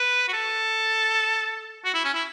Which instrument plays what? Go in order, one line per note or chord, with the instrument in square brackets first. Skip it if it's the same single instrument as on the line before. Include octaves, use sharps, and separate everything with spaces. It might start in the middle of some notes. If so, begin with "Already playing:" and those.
Already playing: [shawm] B4
F#4
A4
F#4
E4
C#4
E4